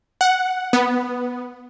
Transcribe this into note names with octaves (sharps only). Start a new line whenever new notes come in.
F#5
B3